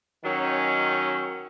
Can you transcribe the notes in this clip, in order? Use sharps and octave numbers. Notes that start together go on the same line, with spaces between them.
D#3 F#3 C#4